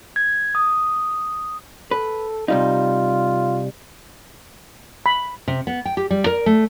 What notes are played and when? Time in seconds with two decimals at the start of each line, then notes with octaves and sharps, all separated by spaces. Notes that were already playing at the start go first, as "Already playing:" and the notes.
0.16 G#6
0.55 D#6
1.91 A4 B4
2.48 C3 G3 D#4 F4
5.06 B5
5.48 C3
5.67 B3
5.85 G5
5.97 G4
6.11 G3
6.26 A#4
6.46 A3